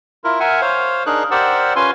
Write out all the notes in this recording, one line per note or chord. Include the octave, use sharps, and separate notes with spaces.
E4 F4 A#4
A#4 E5 F#5 G#5
C5 C#5 F5
D4 D#4 G#4 A#4 F#6
G4 A#4 C5 D5 F#5 E6
C#4 F4 B4 G#5 C6